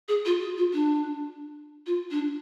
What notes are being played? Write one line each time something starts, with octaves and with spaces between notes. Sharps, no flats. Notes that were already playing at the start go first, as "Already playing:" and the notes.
G#4
F4
F#4
F4
D4
F4
D4